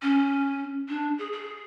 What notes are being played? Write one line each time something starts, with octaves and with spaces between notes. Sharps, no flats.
C#4
D4
G#4
G#4